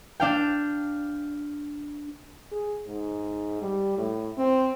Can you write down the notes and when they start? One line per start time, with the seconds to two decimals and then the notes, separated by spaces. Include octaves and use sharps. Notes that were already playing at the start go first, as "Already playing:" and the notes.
0.20 D4 F5 G5
2.52 G#4
2.87 G#2
3.62 G3
3.97 A2
4.37 C4